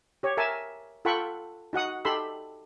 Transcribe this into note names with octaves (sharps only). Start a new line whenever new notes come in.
G4 C#5
A#4 E5 G#5 A5
F4 A4 F#5 G5 B5 C#6
D#4 F#4 F#5 D#6
D#4 G4 A4 B5 C6 E6